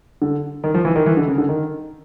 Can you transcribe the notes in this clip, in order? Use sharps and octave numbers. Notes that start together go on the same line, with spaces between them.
D3
D#3
F3
E3
D#3
E3
D3
C#3
D3
D#3